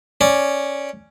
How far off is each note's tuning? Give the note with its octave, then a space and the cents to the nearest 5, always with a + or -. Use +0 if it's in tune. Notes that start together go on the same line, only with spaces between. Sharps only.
C#4 +0 D5 +0